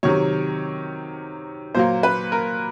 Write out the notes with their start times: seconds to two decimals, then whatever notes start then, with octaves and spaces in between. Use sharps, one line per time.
0.03 C3 D#3 F#3 C#5
1.74 A#2 F#3 A#3 C5
2.03 B4
2.32 A#4